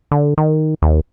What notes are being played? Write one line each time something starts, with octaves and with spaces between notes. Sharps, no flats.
D3
D#3
D#2